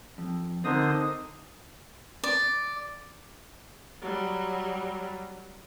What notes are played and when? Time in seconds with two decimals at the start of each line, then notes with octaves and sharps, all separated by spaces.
0.18 F2
0.64 D3 C4 D#4 A#4 C5 D#6
2.24 D5
4.02 F#3 G3